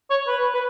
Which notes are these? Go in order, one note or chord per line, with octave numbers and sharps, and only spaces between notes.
C#5
B4
B4